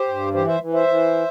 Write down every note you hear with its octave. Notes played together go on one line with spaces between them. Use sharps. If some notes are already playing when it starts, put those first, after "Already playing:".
Already playing: G4 C5
G2
E3 G4 C5
C5 E5
E3
C5 E5
E3